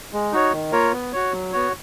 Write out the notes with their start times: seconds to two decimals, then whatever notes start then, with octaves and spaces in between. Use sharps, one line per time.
0.13 G#3
0.32 D#4 F#4 C#5
0.52 D#3
0.72 A#3 F4 A#4 C#5
0.92 B3
1.13 F#4 C#5
1.33 F#3
1.52 B3 F#4 C#5